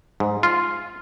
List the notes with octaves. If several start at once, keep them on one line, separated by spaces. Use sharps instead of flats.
G#2
F4